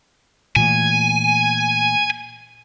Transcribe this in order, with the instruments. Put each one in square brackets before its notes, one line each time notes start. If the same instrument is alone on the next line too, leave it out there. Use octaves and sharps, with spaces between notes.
[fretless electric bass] A#2 E3 A3 [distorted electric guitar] G#5